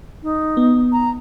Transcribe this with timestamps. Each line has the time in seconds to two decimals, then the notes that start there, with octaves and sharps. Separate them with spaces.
0.23 D#4
0.57 B3
0.92 A#5